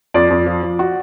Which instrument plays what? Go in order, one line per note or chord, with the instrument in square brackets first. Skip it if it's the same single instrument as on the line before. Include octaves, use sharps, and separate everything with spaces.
[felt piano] F2 [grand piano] D5
[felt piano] F2
F3
F3
F#4